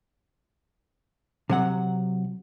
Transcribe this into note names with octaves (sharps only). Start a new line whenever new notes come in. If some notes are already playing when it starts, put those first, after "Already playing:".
C3 F#3 F#5